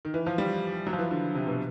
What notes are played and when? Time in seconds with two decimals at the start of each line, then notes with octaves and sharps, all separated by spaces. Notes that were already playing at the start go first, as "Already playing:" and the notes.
0.05 D#3
0.14 E3
0.26 F3
0.38 G3
0.87 F#3
0.93 F3
0.98 E3
1.11 D3
1.35 C3
1.47 B2